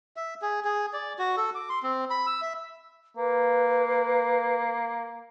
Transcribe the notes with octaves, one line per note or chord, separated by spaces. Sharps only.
E5
G#4
G#4
D5
F#4
A4
D6
C6
C4
B5
E6
E5
A#3 B4